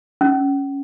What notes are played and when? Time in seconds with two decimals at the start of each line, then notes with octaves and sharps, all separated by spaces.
0.21 C#4